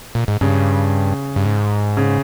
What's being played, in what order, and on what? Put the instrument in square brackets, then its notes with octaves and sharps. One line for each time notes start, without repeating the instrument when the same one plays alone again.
[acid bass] A#2
G#2
[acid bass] G2 [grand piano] C#3
[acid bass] G2
G#2
[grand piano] C#3